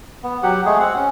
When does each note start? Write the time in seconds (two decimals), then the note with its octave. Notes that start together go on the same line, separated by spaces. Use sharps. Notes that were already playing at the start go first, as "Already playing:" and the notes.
0.23 B3
0.43 F#3 G4 F#5
0.65 G#3 A3 G#4
0.80 C4 F#5
0.97 C#4